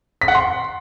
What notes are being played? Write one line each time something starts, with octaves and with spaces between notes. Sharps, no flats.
B6
F#5
C6